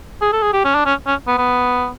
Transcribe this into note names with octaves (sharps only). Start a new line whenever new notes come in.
G#4
A4
G#4
G4
C#4
D4
C#4
C#4
B3
B3